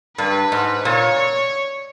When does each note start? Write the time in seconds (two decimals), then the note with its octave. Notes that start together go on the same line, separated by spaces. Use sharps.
0.18 G2 B4
0.52 G#2
0.85 A#2 C#5